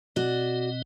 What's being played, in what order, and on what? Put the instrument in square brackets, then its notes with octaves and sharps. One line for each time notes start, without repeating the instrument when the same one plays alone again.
[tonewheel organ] B2 C4 D#5 [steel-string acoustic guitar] F#4 D5